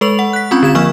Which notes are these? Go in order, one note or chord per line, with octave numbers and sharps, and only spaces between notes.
G#3 A4 B4 C#6 F7 F#7
F#5
F#6 B6
C4 C#4 F4 B5 C#6 G6
D3 G#6 E7
F3 A#3 C#6 E6 F6